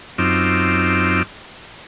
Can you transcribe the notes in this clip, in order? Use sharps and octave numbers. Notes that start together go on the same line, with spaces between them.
F#2 C4 D#4 F4 D6 E6